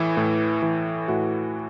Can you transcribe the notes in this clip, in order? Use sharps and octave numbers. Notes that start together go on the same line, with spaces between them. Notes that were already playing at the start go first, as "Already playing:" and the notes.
Already playing: A2 E3 E4
A2
E3
A2 F#4